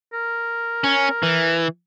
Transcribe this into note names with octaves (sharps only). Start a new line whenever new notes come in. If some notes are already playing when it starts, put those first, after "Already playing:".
A#4
C#4
E3